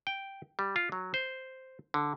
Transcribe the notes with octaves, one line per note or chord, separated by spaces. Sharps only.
G5
G3
F4
F#3
C5
D3